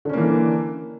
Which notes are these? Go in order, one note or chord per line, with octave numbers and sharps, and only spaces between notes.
D3 E3 A#3 C#4